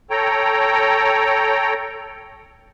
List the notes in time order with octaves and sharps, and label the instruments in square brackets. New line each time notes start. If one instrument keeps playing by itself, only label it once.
[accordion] A4 C#5 G5 A#5